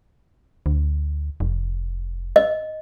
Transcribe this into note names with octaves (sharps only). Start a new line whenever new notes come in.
D2
F1
D#5